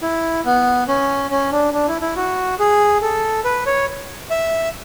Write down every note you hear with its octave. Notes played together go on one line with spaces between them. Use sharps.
E4
B3
C#4
C#4
D4
D4
E4
E4
F#4
G#4
A4
B4
C#5
E5